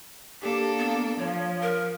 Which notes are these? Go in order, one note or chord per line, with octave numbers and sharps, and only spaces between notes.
A#3 D4 G4 A4
B3
F3 C#5
A#4